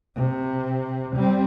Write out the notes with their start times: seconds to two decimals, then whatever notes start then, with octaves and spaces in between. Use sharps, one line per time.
0.16 C3
1.16 G3 C4